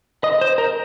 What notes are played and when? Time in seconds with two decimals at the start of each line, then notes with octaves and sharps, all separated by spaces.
0.24 D#5
0.41 C5
0.58 A#4